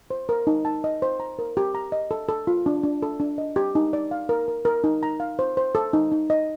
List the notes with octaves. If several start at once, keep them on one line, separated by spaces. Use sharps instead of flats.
C5
A#4
D#4
A5
D#5
C5
A#5
A#4
G4
A#5
D#5
A4
A4
F4
D4
D4
A4
D4
D#5
G4
D#4
D5
F5
A#4
A#4
A#4
D#4
A#5
F5
C5
C5
A4
D#4
D#4
D#5